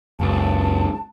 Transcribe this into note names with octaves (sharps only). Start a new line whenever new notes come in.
F#1 C#2 A5